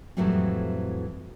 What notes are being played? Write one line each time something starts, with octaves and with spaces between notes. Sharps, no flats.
F2 A2 E3 F#3 G3 C4